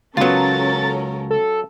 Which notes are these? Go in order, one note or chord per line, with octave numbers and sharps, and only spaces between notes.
C#2 F#3 B3 C#4 F4 A4 A#4 A6
A4